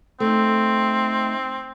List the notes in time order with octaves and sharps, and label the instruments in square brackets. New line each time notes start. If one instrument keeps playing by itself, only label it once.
[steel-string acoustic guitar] A3 D#4 [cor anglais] C4